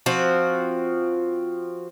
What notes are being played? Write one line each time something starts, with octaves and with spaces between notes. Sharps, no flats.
F3 C4 F#4